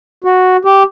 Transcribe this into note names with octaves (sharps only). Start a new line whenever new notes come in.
F#4
G4